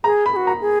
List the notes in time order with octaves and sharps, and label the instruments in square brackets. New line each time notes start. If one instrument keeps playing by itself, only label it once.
[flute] G#4 [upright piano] A#5
[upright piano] B5
[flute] G#4
F#4
[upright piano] A#5
[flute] G#4